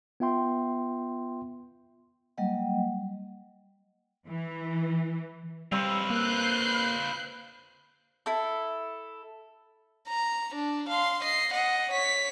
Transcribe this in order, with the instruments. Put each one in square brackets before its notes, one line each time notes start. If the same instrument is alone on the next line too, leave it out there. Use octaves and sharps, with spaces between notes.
[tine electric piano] B3 F4 E5 G5 C6
[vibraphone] F#3 G3 A#3 D#5 F#5 G5
[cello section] E3
[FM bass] G3 [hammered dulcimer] C4 [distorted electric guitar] F4 B4
[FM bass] A#3 [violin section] F#6 G6 C7
[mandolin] E4 A4
[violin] A#5
D4
F5 C6
D#5 C7
D#5 F#5
C#5 B6